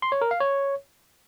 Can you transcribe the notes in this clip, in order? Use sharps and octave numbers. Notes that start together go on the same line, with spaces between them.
C6
C#5
A#4
F5
C#5